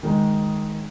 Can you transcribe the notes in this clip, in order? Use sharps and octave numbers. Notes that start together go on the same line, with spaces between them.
D#3 G#3 D#4